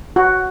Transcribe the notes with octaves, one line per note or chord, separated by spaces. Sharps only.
F#4